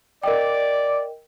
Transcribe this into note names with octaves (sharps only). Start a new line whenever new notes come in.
A#4 D5 D#5 G5